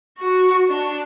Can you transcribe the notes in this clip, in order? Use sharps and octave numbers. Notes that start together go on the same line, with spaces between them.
F#4
D4